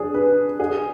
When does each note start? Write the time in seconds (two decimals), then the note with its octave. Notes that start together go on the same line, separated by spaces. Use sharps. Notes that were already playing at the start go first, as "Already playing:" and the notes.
Already playing: D4 G#4
0.14 B4
0.60 G#4